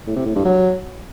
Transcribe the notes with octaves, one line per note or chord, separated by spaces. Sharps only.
A2
C3
A2
G2
F#3